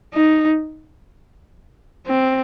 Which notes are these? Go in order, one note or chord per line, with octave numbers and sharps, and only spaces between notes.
D#4
C4